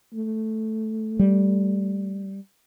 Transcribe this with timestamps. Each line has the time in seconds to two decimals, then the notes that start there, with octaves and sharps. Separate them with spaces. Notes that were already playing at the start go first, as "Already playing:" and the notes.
0.13 A3
1.19 G3